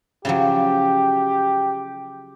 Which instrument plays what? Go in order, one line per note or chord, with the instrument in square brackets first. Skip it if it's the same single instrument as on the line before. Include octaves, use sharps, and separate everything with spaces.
[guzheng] C#3 F3 F#3 [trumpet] G4